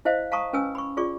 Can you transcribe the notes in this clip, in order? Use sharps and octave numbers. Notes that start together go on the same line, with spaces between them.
E4 C5 D#5 F5
F5 A5 A#5 C#6 D#6
C#4 B4 G#5 E6
B5 C#6
F4 G#4 D5 C#6